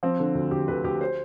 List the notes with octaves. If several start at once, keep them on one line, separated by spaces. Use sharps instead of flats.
F3 C4
D3
D2
D2 G4
D2 B4
D2 G4
C5